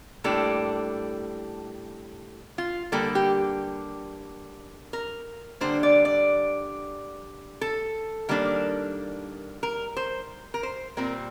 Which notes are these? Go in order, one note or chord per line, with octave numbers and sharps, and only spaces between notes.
A2 G3 A#3 D4 A4
F4
D3 G3 A#3 D4 A4
G4
A#4
D3 G3 A#3 D4 C5
D5
D5
A4
D#3 G3 A#3 D4
A#4
C5
A#4
C5
A#2 G3 C4 A#4